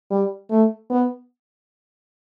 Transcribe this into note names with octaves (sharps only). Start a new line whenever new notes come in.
G3
A3
B3